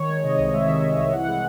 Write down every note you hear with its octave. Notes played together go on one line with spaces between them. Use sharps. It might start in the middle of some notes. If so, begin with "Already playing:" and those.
Already playing: D#3 C#5
G#3
C3 D#5
C2
G#3 E5
D#3
G#3
C2
E3 F#5
G#3